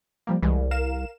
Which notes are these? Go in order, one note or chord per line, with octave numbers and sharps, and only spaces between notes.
F3 G3 A#3
C2 E3 G3 G#3
A#4 F5 E7